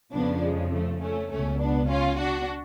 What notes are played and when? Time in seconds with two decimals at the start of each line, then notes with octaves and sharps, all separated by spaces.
0.13 F2 C#3 F3 B3 D4
0.43 G#3
0.73 A3
1.02 A3 C#4
1.31 C#2 B2 A3 C#4
1.60 B3 D4
1.89 C#4 F4
2.19 D4 F#4